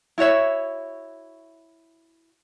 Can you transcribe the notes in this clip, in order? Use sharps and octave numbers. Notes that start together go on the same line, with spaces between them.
E4 F#4 C#5 E5